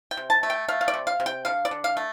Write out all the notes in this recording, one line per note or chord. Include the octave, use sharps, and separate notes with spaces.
G5
C3
A5
A3
G5
A3 F5
F5
D5
C3
F5
C3
G5
D3 F5
D5
D3
F5
A3